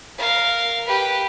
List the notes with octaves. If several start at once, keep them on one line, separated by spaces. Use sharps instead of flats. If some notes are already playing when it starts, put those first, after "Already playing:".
A#4 F5
G4 B4